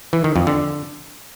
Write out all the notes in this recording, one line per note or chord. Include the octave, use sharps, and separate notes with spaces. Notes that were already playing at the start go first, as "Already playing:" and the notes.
E3
D#3
F2
D3